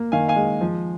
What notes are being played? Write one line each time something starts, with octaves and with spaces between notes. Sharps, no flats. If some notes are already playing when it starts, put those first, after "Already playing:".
Already playing: A#3
D#3 F5 G#5
F5 G#5
G#3
F3